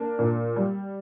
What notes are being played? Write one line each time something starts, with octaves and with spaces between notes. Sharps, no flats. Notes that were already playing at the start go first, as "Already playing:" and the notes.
Already playing: A#3 D4
A#2
G3